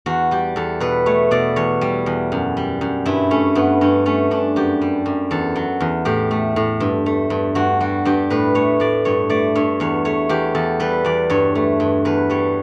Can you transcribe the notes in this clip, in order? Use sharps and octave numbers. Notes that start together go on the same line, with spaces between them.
E2 F#4
G3 G4
E2 A4
B2 B4
A3 C#5
B2 D5
E2 C#5
G3
E2
F#2
G3
F#2
G2 E4
A3 C#4
G2 B3
G2 C#4
A3 C#4
G2 D4
F#2 G4
G3
F#2
E2 A4
F#3
E2
A2 G4
A3
A2
G2
A3
G2
G2 F#4
G3 F#4
G2 G4
A2 B4
A3 C#5
A2 D5
G2 C#5
A3 D5
G2 C#5
E2 C#5
A3 C#5
E2 G4
E2 A4
G3 B4
E2 D5
G2 C#5
A3
G2
E2 B4
G3 C#5